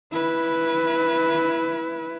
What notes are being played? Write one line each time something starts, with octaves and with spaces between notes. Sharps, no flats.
E4 B4